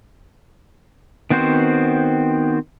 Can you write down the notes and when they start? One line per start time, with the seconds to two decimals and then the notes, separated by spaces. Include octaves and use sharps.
1.30 D#3 B3 C4 F#4 C5